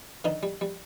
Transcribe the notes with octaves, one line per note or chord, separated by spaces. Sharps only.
D3 D#3 D#4
G3
G3